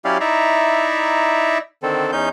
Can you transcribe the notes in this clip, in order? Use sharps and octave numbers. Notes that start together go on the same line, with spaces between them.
F#3 C#4 E4 G4 D5 F5
D#4 E4 D5 E5 A#5
D3 D#3 C4 A4
E2 C#4 D#4 G6